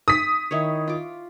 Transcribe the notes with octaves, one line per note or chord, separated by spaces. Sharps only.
D#6 B6
D#3 E4 C#5
F4 D6